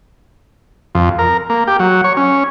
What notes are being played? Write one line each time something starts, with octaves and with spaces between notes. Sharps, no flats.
F2
A#4
A#3
G4
F#3
C#5
C#4